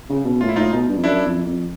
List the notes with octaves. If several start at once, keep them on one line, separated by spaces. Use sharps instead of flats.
C#3
B2
A2 F4
E4
A2 D#4 F4
B2
G2
F2
F#2 D4 E4
F2
F2